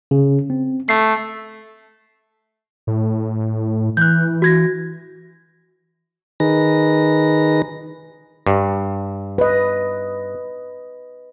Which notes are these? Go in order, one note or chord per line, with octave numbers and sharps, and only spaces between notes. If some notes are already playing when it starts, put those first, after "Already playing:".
C#3
C4
A3 C7
A2
E3 F#6 G6
F#4 G#6 A#6
D#3 D#4 G#4 B4 A#6
G2
B4 D#5